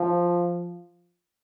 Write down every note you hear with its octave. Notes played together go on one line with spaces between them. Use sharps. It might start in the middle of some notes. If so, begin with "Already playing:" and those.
Already playing: F3